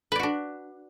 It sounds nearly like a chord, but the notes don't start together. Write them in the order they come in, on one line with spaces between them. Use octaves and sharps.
B4 D5 F#4 D4